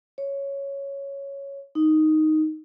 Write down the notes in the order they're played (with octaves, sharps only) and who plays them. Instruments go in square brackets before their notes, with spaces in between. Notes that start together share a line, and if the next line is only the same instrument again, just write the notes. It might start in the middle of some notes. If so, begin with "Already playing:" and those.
[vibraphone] C#5
D#4